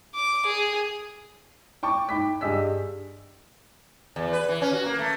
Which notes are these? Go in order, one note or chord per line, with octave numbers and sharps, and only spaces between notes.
D6
G#4
G5 A5 C#6 D6
D#4 G5 B5 D6 B6
G2 G4 G#4 D#5 E6 B6
E2
B4
E3
C#4
F#4
A#3
A3